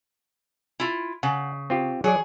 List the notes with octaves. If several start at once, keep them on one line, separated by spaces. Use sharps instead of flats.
E4 F4
C#3 F#5
C4 F4 G4
F#3 G#4 C#5 D5